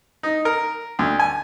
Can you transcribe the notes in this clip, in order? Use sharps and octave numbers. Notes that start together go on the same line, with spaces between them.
D#4
A#4
D2
G#5